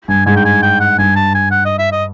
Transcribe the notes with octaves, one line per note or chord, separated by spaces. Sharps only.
G2 G#5
G#2 G#5
G5
G#5
G5
F#5
G2 G#5
A5
G#5
F#5
D#5
E5
D#5